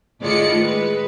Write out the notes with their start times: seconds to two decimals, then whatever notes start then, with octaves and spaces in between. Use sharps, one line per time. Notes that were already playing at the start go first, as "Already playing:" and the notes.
0.22 A2 D#3 G#3 F4 D5 C#7
0.59 G#3 B4